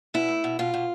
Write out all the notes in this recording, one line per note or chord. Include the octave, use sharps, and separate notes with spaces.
B2 E4
A3
B2
B2 F4
B2